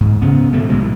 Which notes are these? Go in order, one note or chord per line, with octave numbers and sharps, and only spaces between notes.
G#2
C#3 B3
B2 D3 A3
B1 A2 C3 G#3